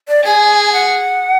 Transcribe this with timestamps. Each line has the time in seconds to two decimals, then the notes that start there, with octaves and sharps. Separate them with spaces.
0.08 D5
0.24 G#4 G#5
0.73 F#5